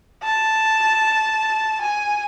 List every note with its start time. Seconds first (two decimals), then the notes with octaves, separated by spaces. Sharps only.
0.24 A5
1.81 G#5